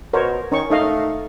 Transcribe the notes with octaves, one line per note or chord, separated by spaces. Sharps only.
B2 A#4 C5 C#5
D#3 C#4 C#6
A3 D#4 D#5 F5